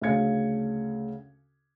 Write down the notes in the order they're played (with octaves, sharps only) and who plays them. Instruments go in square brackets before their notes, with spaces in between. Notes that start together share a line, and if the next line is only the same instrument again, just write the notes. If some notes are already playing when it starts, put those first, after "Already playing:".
[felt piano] D2 C#3 C#4 F5 G#6 C#7